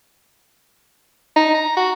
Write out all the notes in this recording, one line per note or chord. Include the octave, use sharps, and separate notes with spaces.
D#4
A#5
F#4